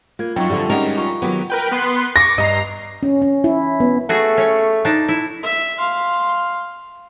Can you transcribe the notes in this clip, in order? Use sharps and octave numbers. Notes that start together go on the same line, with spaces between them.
A#3 F4 G#6
F#2 F#3 D#4 F4 G5 C#6
D3 F3 G3 C4 G4 E5
G3 G#3 C#4 D#4 G4 A#4 F#5 A#5
F4 A#5 C#6
D#3 F#3 B3 G4
A#4 B4 G5
B3 B4 C6
C#6 D6 A#6
G2 D#5 A#5 C7
C#4
C#4
E4
B3
A3 F#4 G#4
C#4 C#5
D4 D#4 A5
E4
E5
F5 C6